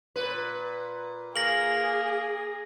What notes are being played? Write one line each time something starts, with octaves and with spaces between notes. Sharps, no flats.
A#2 B4
A#3 G#4 A#6 F#7